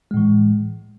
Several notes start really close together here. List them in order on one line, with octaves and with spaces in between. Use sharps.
G#3 A2 E3